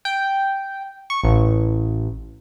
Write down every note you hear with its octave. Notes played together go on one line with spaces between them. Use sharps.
G5
C#6
A1